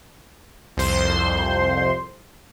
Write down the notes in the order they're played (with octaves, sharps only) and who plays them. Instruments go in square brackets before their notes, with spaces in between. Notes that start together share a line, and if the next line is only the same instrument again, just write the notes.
[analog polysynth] C2 F2 C5 C6